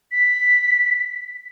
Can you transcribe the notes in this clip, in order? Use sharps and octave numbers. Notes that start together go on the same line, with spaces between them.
B6